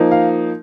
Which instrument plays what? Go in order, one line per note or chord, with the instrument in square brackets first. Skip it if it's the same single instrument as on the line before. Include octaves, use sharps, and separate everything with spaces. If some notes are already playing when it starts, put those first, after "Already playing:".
Already playing: [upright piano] F3 A#3 D#4
F5